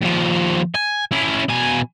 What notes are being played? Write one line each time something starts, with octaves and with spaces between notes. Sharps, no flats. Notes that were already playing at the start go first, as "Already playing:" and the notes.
D#2 F3
G#5
C#4 E4
B2 G#5